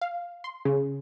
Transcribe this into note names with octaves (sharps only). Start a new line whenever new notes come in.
F5
C6
C#3